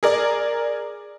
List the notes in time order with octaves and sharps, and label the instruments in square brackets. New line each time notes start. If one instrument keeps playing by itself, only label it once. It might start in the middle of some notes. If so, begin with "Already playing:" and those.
[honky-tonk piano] G#4 A#4 D5